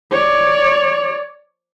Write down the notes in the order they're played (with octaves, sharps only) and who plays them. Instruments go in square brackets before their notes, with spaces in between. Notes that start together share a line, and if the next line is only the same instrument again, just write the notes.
[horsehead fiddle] C#5 D5